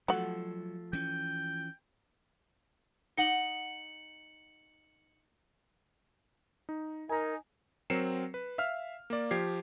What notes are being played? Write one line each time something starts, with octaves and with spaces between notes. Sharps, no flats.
F3 F#3 A3 F#4 F#5
E3 C#4 G5
D#4 F#5 C#7 F#7
D#4
D#4 A#4 G#5 A#5
F#3 C4 A#4 C7 C#7 E7
B4
E5 F5 F6
A#3 D5
F3 G4 G#6 C7